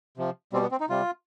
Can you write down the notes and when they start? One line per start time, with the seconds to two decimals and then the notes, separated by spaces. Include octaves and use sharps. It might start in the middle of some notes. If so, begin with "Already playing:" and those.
0.17 C3 F3
0.53 B2 G3 C4
0.62 B3
0.71 C4
0.81 D#4
0.89 C3 G3 F4